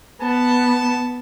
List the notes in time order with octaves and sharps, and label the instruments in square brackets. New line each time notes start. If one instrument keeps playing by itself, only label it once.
[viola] B3 [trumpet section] A5